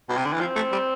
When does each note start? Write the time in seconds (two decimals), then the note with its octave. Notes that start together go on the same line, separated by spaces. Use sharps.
0.09 B2
0.17 C3
0.25 D3
0.33 E3
0.40 F3 C4
0.56 A3
0.72 G3